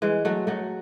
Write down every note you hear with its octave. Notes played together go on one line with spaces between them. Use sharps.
E3 G#3
F#3 A3
F#3 A3